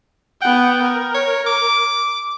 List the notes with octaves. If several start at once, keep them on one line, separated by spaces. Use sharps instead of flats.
B3 F#5 G5
A#4
C#5
D6